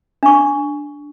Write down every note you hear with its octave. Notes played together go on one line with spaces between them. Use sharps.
D4 C#6